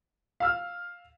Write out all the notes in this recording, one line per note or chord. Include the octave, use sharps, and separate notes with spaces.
F5 E6 F6